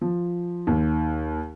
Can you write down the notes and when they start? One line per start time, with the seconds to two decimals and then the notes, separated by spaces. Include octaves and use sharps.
0.01 F3
0.67 D#2